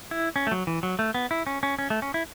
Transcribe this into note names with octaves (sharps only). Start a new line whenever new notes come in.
E4
C#4
A3
F#3
E3
F#3
A3
B3
E4
C#4
C#4
C#4
A3
C#4
E4